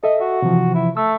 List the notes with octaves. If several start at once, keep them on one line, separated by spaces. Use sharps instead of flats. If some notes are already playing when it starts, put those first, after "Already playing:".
A4 D#5 E5
F#4
C3 E3 F3
E4
A3 E6